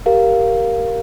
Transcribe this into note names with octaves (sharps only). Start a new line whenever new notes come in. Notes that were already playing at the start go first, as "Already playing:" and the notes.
G4 A#4 F5